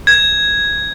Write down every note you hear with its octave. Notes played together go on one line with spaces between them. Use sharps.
G#6